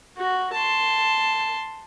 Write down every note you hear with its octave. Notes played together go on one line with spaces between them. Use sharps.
F#4
A5 C6